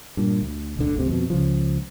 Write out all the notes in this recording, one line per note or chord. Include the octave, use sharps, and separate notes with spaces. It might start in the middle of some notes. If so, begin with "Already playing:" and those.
G2 A#2
D2
E1 D2 D3
G1 D2 C3
F2 B2
C#2 C#3 F3